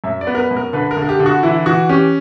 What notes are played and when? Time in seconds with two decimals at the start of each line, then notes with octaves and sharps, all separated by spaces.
0.04 F#2 E5
0.21 D5
0.27 B3
0.35 A#4
0.39 B4
0.51 F#2
0.56 A#4
0.73 D3 B4
0.91 A#4
0.97 D3
1.02 A#4
1.09 G4
1.20 D3
1.26 F#4
1.43 E3 E4
1.66 E3 F#4
1.89 C#4 G4